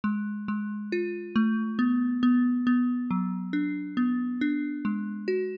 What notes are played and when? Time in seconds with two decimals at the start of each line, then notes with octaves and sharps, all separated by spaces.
0.04 G#3
0.48 G#3
0.92 F4
1.36 A3
1.79 B3
2.23 B3
2.67 B3
3.11 F#3
3.53 D4
3.97 B3
4.41 D4
4.85 G#3
5.28 F#4